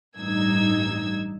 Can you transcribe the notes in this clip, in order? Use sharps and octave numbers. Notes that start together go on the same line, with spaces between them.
A1 G2 D#4 E6 G#6